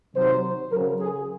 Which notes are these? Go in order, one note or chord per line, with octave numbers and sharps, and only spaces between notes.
C3 D#3 F#3 C5
C#3 F#3 A#4
G#4